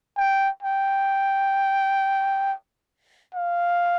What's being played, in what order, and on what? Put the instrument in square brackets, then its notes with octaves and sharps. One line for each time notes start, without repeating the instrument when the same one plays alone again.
[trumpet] G5
G5
F5